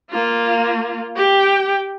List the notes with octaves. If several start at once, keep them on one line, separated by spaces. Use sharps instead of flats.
A#3 F4
G4 G5